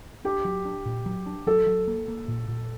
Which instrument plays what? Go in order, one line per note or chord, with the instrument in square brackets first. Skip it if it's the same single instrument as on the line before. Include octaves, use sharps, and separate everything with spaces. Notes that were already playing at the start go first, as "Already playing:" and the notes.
[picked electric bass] D4 [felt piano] G4
[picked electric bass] F#3
D4
A#2
F#3
D4
[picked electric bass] F#3 [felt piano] A4
[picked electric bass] F#3
A#3
A#3
A#2
A#2